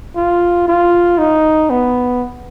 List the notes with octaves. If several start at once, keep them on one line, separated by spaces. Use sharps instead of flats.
F4
F4
D#4
B3